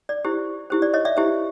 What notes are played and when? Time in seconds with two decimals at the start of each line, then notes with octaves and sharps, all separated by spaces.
0.09 D5
0.24 E4 G4 C5
0.70 E4 G4 C5
0.82 D5
0.94 C#5 D#5
1.05 D5 E5
1.17 E4 G4 C5